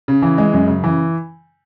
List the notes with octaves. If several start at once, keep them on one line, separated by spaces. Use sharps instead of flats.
C#3
E3
G#3
F#2
C#3
E3